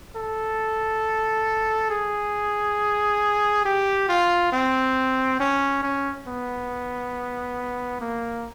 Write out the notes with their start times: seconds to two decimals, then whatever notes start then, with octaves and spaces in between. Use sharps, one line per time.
0.16 A4
1.90 G#4
3.65 G4
4.09 F4
4.52 C4
5.40 C#4
5.83 C#4
6.27 B3
8.01 A#3